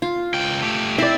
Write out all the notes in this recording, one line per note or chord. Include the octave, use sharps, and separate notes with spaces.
F4
C#2 G5
A3 G4
C4 E4 D5 E5